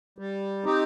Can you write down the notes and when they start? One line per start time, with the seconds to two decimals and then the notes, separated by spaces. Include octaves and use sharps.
0.18 G3
0.65 C4 D#4 G4